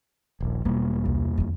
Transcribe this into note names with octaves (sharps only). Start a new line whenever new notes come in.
D#1 A#1
E1 E2 G3 A#3
C2
F2 D3